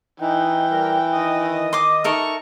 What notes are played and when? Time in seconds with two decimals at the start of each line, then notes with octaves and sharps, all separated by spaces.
0.20 E3 D#4 G5
0.71 G3 A#4
1.13 D#3 D#5 D#6
1.73 C6 D6
2.04 D#4 A4 A#4 E5 C#6